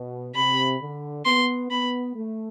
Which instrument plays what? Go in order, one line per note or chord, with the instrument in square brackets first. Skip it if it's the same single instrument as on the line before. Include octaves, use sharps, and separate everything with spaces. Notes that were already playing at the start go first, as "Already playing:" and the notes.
Already playing: [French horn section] B2
[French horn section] C3 [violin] B5
[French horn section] D3
[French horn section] B3 [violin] C6
[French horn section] B3 [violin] B5
[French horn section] A3